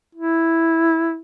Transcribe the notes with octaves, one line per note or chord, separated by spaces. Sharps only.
E4